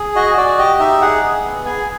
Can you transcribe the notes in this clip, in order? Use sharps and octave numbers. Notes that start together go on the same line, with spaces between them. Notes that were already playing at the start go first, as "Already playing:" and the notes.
Already playing: G#4
F#4 D#5
F#4 D5
G4 D#5
D#4 E5
G#4 F#5
G#4
B3
G#4 G#5